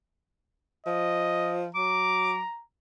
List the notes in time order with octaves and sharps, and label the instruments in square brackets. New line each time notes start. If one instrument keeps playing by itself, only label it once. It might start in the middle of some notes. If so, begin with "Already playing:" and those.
[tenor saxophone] F3 [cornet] D#5
[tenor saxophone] F#3 [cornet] A#5 [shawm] D6